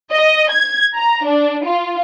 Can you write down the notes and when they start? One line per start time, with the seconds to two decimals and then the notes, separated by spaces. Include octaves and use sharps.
0.12 D#5
0.51 G#6
0.96 A#5
1.25 D4
1.66 F4